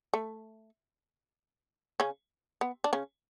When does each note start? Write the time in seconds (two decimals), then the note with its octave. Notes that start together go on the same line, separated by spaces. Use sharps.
0.14 A3
2.00 C#3 C#4
2.61 B3
2.84 D4
2.93 C#3 C#4